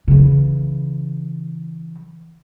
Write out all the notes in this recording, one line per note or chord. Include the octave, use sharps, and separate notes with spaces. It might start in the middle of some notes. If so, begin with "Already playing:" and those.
C#3 E3